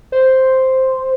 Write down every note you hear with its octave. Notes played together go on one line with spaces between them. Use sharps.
C5